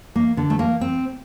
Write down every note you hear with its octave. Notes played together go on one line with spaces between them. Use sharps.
A#3
D3
A3
A#3
C4